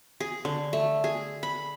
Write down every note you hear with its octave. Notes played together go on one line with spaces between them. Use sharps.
G#4
D3
A3
G#4
B5